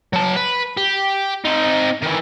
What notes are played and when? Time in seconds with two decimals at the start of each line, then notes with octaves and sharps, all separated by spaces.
0.13 F#3 A5
0.36 B4
0.77 G4
1.45 C4 D#4
2.02 D#3 E3